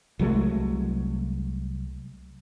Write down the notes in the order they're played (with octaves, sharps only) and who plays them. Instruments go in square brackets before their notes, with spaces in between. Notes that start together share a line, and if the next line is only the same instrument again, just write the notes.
[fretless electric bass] C2 F#3 G#3 A3